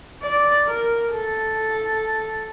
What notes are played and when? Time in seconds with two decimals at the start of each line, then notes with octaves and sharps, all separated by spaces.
0.23 D5
0.67 A#4
1.12 A4